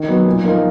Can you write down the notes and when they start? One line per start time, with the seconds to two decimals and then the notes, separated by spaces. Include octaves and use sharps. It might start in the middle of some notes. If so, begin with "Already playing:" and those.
Already playing: D#3
0.08 F#3 B3
0.26 A#2
0.44 F3 A#3 D#4